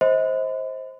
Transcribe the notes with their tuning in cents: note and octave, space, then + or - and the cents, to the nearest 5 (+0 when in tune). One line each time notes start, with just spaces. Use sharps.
C5 +10 D#5 +35 B5 +45